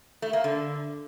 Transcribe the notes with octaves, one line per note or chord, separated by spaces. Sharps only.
A3
A#3
D3